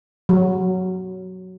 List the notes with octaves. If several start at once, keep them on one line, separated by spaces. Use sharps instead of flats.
F#3